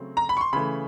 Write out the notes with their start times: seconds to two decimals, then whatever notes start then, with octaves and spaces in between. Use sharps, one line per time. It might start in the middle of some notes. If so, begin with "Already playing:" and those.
Already playing: C#3 F#3 A3 C4
0.17 A#5
0.29 B5
0.37 C#6
0.41 C6
0.53 C#3 E3 A3 B5